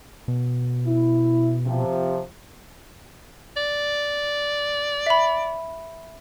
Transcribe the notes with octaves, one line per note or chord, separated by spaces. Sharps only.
B2
E4
C3 F3
D5
E5 B5